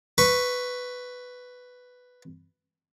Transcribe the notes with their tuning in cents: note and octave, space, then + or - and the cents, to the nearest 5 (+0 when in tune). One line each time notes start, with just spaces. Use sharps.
B4 +5 C#6 +0